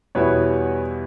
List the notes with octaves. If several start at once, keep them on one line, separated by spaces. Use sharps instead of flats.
E2 B2 G3 B3 E4 B4 C#5